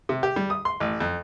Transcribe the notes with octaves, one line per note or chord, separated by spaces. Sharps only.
C3
G4
G3
D#6
C6
A1
F2